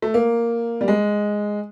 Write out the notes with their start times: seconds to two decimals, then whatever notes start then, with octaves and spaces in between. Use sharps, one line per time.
0.02 A3
0.14 A#3
0.81 G3
0.88 G#3